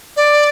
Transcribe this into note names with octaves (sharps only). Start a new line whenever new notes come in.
D5